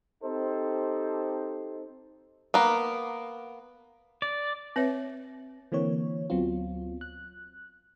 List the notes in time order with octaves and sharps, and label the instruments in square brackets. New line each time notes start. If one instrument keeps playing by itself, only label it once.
[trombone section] C4 D#4 G4 A4 C5
[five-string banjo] A#3 B3
[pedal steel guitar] D5
[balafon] C4 B4 C#5 E5
[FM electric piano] D3 E3 A#3 C4 C#5
D2 F#3 B3 C4 F4
F#6